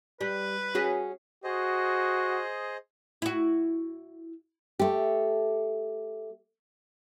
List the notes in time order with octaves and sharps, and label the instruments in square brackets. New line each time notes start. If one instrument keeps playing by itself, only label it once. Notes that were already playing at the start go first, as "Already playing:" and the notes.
[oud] G3 [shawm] B4
[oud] C#4 F#4 G#4
[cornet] F#4 [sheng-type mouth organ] G#4 C5 D#5
[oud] E4 F#4
[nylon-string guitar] A3 G4